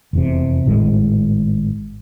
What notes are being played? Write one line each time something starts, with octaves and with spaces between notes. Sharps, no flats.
F1 E2 C3
G#1 A2 D#3 G#3